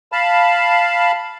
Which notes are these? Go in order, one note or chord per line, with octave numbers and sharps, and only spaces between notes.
F5 A5 B5